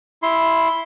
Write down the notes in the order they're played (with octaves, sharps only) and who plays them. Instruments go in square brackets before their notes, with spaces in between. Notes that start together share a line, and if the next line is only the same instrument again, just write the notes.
[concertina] E4 C6